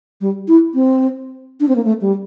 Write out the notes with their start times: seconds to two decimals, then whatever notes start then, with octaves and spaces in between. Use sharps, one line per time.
0.21 G3
0.48 E4
0.74 C4
1.60 D4
1.68 C4
1.76 A#3
1.85 A3
2.01 G3